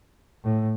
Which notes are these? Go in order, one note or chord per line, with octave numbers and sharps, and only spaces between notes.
A2